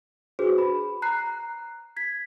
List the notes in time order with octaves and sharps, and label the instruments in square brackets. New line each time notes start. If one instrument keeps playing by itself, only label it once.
[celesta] D4 F#4 G#4 B4 C5
B5
A#5 F#6 C7
G#6 B6